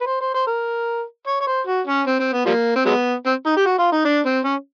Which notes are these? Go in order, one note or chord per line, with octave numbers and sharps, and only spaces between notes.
B4
C5
C5
C5
A#4
C#5
C#5
C5
F#4
C#4
C4
C4
B3
F3 G3 A#3
C4
F#3 G#3 B3
C4
D#4
G4
F#4
F4
D#4
D4
C4
C#4